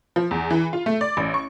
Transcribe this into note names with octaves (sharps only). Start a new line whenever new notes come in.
F3
E2
E3
F4
A3
D5
A1
C#6